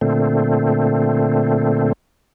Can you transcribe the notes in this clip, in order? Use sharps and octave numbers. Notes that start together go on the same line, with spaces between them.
A#2 D3 A3 C4